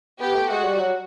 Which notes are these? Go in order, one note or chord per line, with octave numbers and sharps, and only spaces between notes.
B3 G4
A3
G#3 F#4
G3
F#3